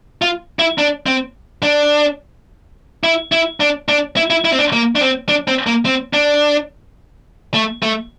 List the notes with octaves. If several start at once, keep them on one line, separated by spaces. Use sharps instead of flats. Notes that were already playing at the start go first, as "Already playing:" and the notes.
F4
E4
D4
C4
D4
E4
E4
D4
D4
E4
E4
E4
C4
D4
A#3
D4
C4
D4
C4
A#3
C4
D4
A3
A3